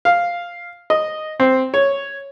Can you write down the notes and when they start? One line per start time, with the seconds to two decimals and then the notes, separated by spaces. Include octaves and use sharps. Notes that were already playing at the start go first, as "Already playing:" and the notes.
0.05 F5
0.90 D#5
1.40 C4
1.74 C#5